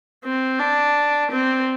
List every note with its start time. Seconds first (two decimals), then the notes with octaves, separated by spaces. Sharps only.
0.24 C4
0.59 D4
1.32 C4